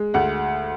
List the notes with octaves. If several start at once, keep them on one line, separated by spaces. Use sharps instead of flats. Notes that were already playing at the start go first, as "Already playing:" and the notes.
Already playing: G#3
D2 F#5